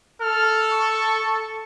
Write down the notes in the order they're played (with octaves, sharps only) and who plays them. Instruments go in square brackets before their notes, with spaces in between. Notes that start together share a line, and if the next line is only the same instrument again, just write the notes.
[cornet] A4 [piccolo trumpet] F6
[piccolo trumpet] C#6